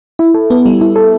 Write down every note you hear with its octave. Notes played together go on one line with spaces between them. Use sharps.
E4
A4
B3
G3
E4
A4